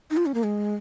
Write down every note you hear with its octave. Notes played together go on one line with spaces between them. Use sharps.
D#4
F4
C#4
A#3
G#3